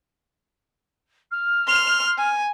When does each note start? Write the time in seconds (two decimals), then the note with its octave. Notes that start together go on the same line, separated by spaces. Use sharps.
1.31 F6
1.67 C6 F7
2.18 G#5